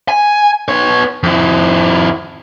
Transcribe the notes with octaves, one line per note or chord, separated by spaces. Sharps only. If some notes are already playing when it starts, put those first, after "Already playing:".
G#5
B3 C#5
F2 E4